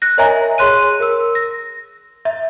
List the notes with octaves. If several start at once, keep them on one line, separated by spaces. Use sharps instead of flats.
F#6 A#6
A#4 C#5 D#5 E5 G#5 A#5
G#4 C#5 C6 F#6 D#7
A#4 E6
A#6
E5